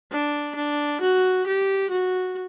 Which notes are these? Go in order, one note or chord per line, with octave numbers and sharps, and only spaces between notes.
D4
D4
F#4
G4
F#4